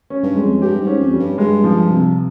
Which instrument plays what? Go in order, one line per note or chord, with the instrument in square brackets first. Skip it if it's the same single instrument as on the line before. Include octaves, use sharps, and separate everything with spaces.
[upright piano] C#4
[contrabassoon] G2
[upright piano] G#3
[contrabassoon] F2
F2
[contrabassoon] G2 [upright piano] G4
[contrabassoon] G#2
[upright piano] C#4
[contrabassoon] F2
[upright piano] G3
[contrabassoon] G2
[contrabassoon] G2 [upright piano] G#3
[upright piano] F3
C3